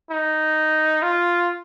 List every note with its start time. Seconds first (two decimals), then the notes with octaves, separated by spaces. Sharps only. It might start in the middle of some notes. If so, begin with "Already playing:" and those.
0.11 D#4
1.02 F4